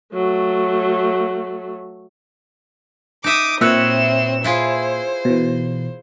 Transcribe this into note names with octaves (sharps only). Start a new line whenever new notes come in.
F#3 A3
D#4 E5 D6 D#6
A#2 C4 F#4 B4 C#5 E5 E7
E4 F4 G#4 C5
B2 E3